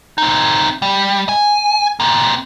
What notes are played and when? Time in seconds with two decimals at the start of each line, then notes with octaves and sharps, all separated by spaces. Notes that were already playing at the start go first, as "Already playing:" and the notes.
0.18 C4 D#4
0.82 G3
1.29 G#5
2.00 A#3 C4